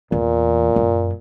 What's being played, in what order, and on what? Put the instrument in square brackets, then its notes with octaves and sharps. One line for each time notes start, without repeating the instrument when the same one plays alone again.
[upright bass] E2 [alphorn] A#2
[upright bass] F#2